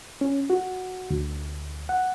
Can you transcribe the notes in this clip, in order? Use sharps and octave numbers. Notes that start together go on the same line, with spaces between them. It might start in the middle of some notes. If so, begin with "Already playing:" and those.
C#4
F#4
D2
F#5